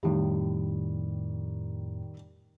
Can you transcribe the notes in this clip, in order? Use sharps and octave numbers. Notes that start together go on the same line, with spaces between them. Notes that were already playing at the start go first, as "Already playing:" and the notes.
F2 A2 D#3 G3